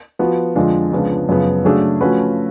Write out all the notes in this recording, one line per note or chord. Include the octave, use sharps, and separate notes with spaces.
F3 B3 F#4
F2 D3 G#3 D4 F4
C#2 C#3 F3 B3 D4
F#2 C#3 F3 B3
C#3 F#3 A3 D4 G#4
F3 A3 C#4 F#4 B4